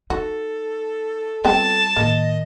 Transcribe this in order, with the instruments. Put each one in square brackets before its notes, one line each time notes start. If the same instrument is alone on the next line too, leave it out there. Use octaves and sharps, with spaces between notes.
[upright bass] D#4 [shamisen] F#4 [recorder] A4
[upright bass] G3 F4 [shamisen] B3 C4 G5 [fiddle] A5
[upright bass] A2 D#3 [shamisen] A#3 [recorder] D#5